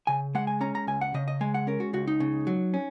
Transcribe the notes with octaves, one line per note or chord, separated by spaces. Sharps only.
C#3 G#5
G#3 F#5
G#5
C#4 A#5
A#5
C#2 G#5
F#5
C#3 D#5
D#5
G#3 G#5
F#5
C#4 A#4
F#4
C#2 F#4
D#4
C#3
F#3
C#4